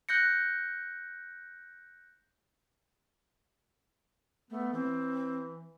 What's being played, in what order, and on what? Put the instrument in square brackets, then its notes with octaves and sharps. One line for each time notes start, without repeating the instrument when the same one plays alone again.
[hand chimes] F#6 G6 A#6 C#7
[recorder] A3 [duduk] B3
[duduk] E3 [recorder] C4